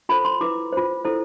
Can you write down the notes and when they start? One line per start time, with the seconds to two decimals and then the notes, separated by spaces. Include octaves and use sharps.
0.09 F4 A4 C5 B5
0.25 C6
0.41 E4 B4 D6
0.73 F4 C5
1.05 E4 A4 C5